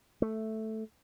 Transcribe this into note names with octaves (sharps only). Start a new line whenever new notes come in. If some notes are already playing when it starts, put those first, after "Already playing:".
A3